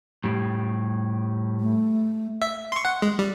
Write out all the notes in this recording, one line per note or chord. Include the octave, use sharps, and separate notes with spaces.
A2 G3
A3
E5
C6 C#6
F#5
G#3
G3